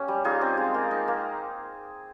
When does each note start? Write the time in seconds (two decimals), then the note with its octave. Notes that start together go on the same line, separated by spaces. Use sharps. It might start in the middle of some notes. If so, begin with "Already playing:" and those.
Already playing: A#3 C#4 G4
0.08 G3
0.24 D#4 F4 G#4
0.41 C4
0.57 G#3
0.74 A#3
0.91 D#4
1.08 A#3